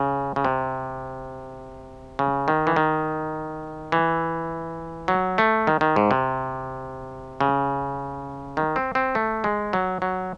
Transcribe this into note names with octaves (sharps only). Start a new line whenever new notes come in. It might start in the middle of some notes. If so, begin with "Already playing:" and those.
Already playing: C#3
C#3
C3
C#3
D#3
E3
D#3
E3
F#3
A3
D#3
D#3
G#2
C3
C#3
D#3
C4
C4
A3
G#3
F#3
F#3